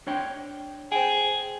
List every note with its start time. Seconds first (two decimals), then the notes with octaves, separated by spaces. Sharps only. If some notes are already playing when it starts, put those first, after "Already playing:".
0.07 D4 C#5 G5
0.92 G#4 C5 G5